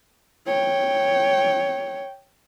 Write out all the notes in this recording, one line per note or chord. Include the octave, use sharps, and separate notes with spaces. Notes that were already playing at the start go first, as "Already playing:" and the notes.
C#5 G5